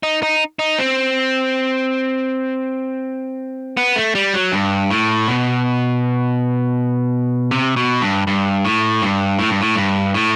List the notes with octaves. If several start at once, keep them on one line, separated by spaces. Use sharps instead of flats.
D#4
D#4
D#4
C4
B3
A3
G3
F#3
G2
A2
B2
C3
B2
G2
G2
A2
G2
A2
G2
A2
G2
A2